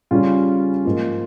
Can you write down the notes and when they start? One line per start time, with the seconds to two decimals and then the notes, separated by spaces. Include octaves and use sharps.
0.11 C#3 G3 C#4 F4
0.85 G#2 F3 A#3